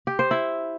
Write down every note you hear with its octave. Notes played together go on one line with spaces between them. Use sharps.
G4
C5
E4